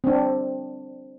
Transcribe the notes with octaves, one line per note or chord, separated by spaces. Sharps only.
C4 D4